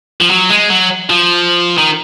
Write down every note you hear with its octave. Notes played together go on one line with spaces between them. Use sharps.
F3
F#3
G#3
F#3
F3
D#3